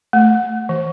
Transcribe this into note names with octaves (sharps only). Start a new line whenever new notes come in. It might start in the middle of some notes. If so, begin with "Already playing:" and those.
A3
E3